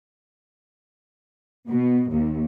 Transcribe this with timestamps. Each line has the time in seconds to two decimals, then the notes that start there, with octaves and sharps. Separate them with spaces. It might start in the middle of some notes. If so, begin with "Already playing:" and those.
1.68 B2
2.12 D#2